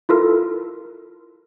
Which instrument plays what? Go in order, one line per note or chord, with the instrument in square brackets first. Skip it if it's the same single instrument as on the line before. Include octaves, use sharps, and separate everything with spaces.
[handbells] E4 F4 A4 A#4